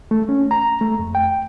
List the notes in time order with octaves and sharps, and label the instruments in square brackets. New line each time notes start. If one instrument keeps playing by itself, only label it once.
[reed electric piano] A3
C#4
A#5
A3
F2
G5